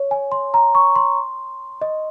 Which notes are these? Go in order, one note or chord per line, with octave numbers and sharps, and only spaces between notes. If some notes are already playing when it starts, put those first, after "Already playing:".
Already playing: C#5
G#5
C6
A#5
C#6
C6
D#5